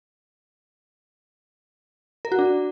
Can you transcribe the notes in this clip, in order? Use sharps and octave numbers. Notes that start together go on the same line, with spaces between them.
A#4
F#4
D4